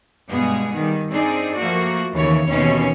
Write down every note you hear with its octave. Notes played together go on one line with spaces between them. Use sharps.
G2 B2 G#3 B3 G#4
D#3 G3
C4 D4 D#4 G#4 D5
F3 A3 A#3 F#4
D#2 C#3 E3 C#5
D#2 B2 E3 C4 C#4 C#5